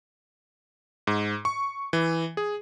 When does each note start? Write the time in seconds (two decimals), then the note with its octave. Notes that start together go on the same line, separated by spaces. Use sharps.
1.07 G#2
1.45 C#6
1.93 E3
2.37 G#4